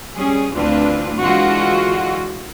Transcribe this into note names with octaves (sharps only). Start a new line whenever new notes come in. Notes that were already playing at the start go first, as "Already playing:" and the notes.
G3 C#4 G#4
D2 E3 C4 D4 F4 B4
D3 E3 G#3 F4 F#4